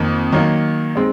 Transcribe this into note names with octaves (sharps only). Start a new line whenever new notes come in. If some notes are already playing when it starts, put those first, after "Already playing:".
Already playing: F2 D#3 A#3
D#3 F#3 A#3 D#4
G#3 C4 D#4